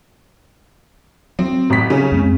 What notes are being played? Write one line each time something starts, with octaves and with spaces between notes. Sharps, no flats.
F#3 C4
A1 B6
C#3 C#4
F2 G#3 C4